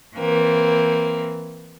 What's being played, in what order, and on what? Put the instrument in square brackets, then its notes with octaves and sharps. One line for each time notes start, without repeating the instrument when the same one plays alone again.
[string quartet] E3 A#3 C4